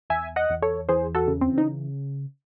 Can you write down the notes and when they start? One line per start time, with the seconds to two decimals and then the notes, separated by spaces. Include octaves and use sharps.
0.10 E2 E5 G#5
0.36 D#5 F#5
0.50 E2
0.62 A4 C#5
0.89 E3 G#4 C5
1.15 F#4 A4
1.28 C#3
1.41 C4
1.58 D#4